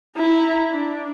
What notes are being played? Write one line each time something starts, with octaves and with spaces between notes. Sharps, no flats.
E4 A#5
D4